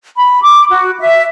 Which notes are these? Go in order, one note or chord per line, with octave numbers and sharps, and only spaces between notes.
B5
D6
F#4
E5